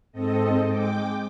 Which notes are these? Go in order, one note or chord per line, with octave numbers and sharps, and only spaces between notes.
G#2 C4 A4 D#5
G#3 G5 D6